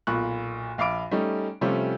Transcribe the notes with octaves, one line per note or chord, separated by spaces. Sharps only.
B1 A#2 F4 B5 C#6 F#6
A#1 F5 B5 D6 D7
G3 A3 C#4 D#4
C3 F3 G3 A3 C#4 F4